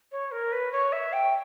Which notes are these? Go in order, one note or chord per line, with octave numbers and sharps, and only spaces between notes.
C#5
A#4
B4
C#5
E5
G5